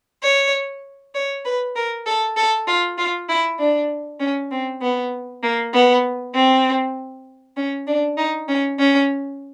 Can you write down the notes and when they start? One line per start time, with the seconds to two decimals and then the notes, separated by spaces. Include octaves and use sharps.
0.23 C#5
1.15 C#5
1.45 B4
1.76 A#4
2.06 A4
2.37 A4
2.67 F4
2.98 F4
3.29 E4
3.59 D4
4.20 C#4
4.51 C4
4.82 B3
5.43 A#3
5.74 B3
6.34 C4
7.57 C#4
7.87 D4
8.17 D#4
8.48 C#4
8.79 C#4